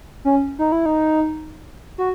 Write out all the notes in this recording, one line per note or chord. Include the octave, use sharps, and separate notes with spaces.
C#4
D#4
E4
D#4
F#4